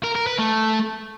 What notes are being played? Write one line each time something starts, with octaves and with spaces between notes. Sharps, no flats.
A#4
A#4
B4
A3